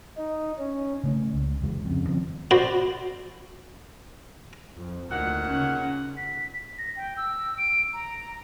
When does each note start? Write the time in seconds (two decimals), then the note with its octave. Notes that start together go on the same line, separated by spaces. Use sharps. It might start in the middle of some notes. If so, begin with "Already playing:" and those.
0.17 D#4
0.58 C#4
1.03 C#3 A3 C#4
1.33 C#2
1.61 F1 E2 G#3
1.85 F2 C#3
2.07 D#3 F3 C4
2.51 F#4 B4 C5 D5
4.78 F2
5.11 D2 A#2 D#3 F#5
5.48 C#3 C#4
6.17 B6
6.78 A#6
6.96 G5
7.17 E6
7.58 D7
7.93 A#5